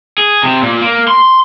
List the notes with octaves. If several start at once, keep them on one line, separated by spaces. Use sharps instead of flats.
G#4
C3
A#2
A#3
C6